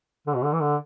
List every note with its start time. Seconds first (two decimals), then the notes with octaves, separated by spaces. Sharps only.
0.27 D3
0.35 B2
0.44 D3
0.53 E3
0.61 D3